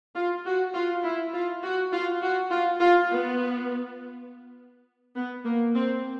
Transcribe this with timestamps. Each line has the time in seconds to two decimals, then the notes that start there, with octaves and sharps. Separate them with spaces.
0.16 F4
0.46 F#4
0.75 F4
1.04 E4
1.34 F4
1.63 F#4
1.93 F4
2.22 F#4
2.51 F4
2.81 F4
3.10 B3
5.16 B3
5.46 A#3
5.75 C4